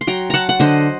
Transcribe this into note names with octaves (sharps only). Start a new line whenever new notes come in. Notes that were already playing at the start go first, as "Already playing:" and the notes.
C6
F#3 G5 A#5
F#3 F#5 A5 A#5
F#5
D3 C5 D#5